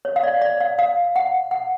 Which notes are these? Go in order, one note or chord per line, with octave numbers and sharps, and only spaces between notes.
C#5
F5
D5
D5
F5
F5
F#5
F#5